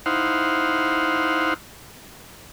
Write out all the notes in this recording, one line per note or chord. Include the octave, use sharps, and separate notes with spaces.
D#4 E4 C5 F5 F#5